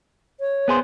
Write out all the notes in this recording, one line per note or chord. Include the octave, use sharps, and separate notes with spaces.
C#5
B3 G#4 C5